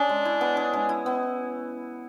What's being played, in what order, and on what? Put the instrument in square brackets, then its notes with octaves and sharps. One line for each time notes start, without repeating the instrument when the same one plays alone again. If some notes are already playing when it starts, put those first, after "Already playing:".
Already playing: [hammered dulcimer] C#4 G#4 [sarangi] D4
[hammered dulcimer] G#3
E4
B3
G#4
G#3
E4
B3